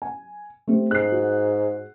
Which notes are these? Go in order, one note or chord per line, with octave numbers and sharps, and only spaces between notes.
G#5
A3 C4 G4
G#2 F#6 C7
F#4